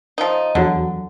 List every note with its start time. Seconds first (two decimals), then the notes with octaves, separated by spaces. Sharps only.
0.18 F3 D#4
0.55 E2 D3 F#3